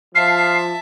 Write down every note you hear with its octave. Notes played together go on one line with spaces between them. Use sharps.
F3 E5 F5 A5 C7